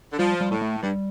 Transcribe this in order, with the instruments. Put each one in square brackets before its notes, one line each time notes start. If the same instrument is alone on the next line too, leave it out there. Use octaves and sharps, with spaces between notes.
[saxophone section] D3
[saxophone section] F3 [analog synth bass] G3
[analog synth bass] G3
[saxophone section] A2
[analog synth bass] A3
[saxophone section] G2 [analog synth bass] G3